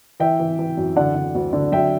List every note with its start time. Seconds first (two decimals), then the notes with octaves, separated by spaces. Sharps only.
0.20 E3 E5 G5
0.40 E3
0.59 E3
0.77 F#2
0.96 D3 D5 F#5
1.15 D3
1.35 D2
1.53 D3
1.72 F#3 E5 G5